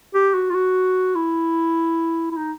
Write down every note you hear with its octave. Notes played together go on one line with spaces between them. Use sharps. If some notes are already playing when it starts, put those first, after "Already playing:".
G4
F#4
F4
F#4
E4
E4
D#4